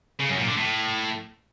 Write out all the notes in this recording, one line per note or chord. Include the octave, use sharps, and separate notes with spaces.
C#3
F#2
A#2
D3
A2